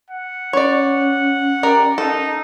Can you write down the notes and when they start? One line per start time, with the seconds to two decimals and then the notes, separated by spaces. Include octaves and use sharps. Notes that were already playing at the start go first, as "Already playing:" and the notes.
0.10 F#5
0.53 C#4 C#5 D5
1.63 G4 A#4 D5
1.98 D#4 A4